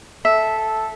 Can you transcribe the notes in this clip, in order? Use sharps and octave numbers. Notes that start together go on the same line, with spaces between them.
A4 E5